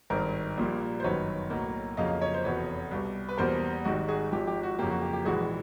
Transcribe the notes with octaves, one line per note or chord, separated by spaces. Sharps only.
G#1 G2 D#3 A#4 C5
A#1 A#2 G3 A#3
C5
G1 F#2 D#3 F#3 B4 C#5
B1 A2 F#3 A#3
F2 C#3 F#3 A#3 D#5 F5
C#5 D#5
C5
F1 E2 B2 B4 C#5
C2 B2 G3
B4
E2 B2 G3 A#3 A#4 C5
G#1 G#2 D#3 G3 F#4
F#4 G#4
G#1 G#2 F3 G4
G4
F#4
F2 C#3 F#3 A#3 G4
F#4
G4
G4
A#1 G#2 E3 G#3 F#4 G#4